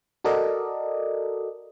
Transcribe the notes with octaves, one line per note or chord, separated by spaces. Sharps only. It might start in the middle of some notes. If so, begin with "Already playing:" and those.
F#4 A4 A#4 D5 D#5